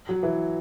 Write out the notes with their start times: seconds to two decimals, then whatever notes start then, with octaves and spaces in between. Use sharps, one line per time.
0.09 F#3
0.23 E3